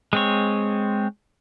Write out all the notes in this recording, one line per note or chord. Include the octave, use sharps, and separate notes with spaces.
G#3 C4 C#5